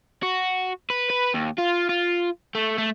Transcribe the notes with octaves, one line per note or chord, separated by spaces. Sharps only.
F#4
B4
B4
D#2
F4
F4
A3
A3